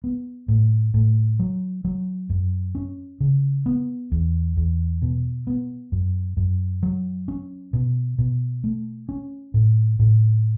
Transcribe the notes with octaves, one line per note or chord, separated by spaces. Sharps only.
B3
A2
A2
F#3
F#3
F#2
C#4
C#3
B3
E2
E2
B2
B3
F#2
F#2
F#3
C#4
B2
B2
A3
C#4
A2
A2